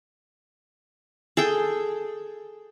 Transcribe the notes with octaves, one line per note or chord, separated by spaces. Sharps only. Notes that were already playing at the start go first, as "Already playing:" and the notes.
G#4 A4 G5